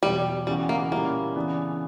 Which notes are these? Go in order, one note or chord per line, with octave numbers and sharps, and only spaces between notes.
E2 B2 F#3 G3
C#3 E3 G3 B3 F#4
A#3
A#2 G3 A#3 C#4 E4 A#4
C#3 E3 B3 D4